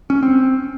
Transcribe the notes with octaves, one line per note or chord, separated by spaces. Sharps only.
C#4
C4